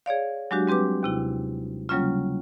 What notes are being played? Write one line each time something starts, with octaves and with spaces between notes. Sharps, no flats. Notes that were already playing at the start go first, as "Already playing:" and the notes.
G#4 C#5 D5 F5
F#3 G#3 D4 F#4 G4
G3 C4 G4 B4 D6
D#2 C3 E4
C#3 F#3 G3 A#3 C#4 F4